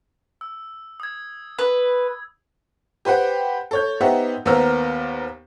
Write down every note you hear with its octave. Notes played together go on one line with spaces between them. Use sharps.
E6
D#6 G#6
B4
G4 B4 C5 F#5 G5
A4 C#5 G6
B3 D#4 G4 C5 E5 F#5
D#2 B3 A#4 C5 E6 F6